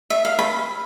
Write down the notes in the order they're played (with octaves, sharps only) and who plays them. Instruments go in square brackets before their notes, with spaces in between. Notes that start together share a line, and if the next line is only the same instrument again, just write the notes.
[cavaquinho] E5
F5
B5